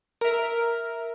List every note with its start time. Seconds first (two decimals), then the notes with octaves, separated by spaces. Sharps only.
0.21 A#4 E5